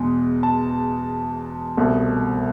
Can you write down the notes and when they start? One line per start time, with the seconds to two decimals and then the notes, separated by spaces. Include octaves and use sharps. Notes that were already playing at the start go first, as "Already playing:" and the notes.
Already playing: E2 B2 G#3
0.43 A5
1.77 C2 B2 A3